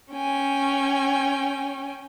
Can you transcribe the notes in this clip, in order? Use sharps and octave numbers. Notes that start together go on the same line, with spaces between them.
C#4 G5 G#5